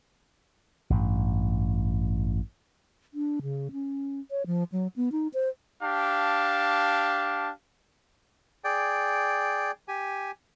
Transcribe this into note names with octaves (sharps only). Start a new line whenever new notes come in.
A1 G2
D4
C#3
C#4
C#5
F3
F#3
B3
D#4
C5
D4 G4 F5 A5
G#4 D5 G5
G4 G#5